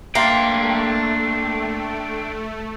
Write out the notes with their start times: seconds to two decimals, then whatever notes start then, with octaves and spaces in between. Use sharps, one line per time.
0.15 A3 A#3 D4 E5 G5 C6 A6